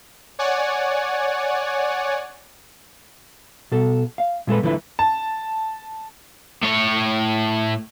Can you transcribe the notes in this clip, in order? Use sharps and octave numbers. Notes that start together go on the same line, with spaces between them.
C#5 D5 F#5 G#5
B2 A4
F5
A#2 G#3 A4 B4
D2 D3 F3 E4 B4
A5
A2 C#5